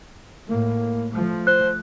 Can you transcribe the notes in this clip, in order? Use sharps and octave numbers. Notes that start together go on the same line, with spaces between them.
A2 A#3
F3 A3
C5 F#6